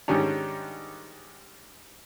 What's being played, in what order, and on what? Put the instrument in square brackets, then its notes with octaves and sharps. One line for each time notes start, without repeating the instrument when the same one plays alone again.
[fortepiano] G#2 D#3 G3 C#4 D4